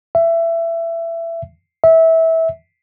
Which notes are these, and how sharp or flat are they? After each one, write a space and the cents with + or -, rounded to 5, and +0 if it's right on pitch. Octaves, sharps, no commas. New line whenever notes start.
E5 +20
E5 -20